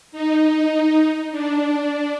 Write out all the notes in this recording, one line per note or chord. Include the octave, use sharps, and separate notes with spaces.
D#4
D4